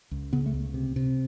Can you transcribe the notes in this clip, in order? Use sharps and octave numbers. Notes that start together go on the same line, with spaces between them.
C#2
C#3 B3
A3
C#2
C3
C3